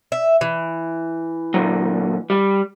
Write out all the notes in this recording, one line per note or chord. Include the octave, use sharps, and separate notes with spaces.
E5
E3
A#2 D3 F#3
G3